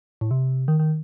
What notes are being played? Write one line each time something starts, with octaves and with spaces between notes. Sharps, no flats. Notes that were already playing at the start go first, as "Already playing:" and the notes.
A2
C3
D#3
D#3